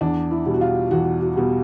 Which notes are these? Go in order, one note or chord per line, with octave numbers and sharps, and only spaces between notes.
E2 D4
E4
B2 G3
F#4
F4
E2 F#4
F#4
B2 G3